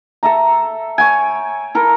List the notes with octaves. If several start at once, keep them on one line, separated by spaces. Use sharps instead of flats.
A4 E5 A#5
C#5 G5 G#5
E4 A4 A#4